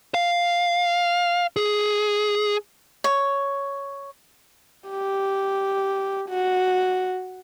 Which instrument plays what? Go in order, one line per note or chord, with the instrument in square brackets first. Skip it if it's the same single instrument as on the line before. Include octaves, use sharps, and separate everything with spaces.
[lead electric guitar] F5
G#4
[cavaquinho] C#5
[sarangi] G4
F#4